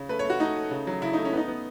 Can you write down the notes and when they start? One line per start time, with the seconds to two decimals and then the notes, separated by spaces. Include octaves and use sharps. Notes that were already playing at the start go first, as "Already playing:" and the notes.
Already playing: C#3
0.09 A3 B4
0.19 C#5
0.24 A3
0.30 F#4
0.40 A3 D#4
0.55 A3
0.71 C#3
0.87 F#3
1.02 C#3 E4
1.13 A3 D#4
1.25 C#4
1.33 B3 D#4
1.48 B3